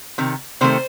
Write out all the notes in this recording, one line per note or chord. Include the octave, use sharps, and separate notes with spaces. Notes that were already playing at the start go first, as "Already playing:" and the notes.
C3 D#3
C3 D#3 A3 C5